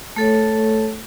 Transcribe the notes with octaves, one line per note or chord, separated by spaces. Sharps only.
A3 A4 C#5